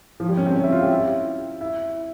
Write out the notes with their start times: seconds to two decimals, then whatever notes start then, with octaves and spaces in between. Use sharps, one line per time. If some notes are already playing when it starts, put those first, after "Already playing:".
0.20 F3
0.29 G3
0.37 C#4
0.47 C4
0.55 C#4
0.64 E4
0.73 F4
0.82 G4
0.91 E4
1.61 E4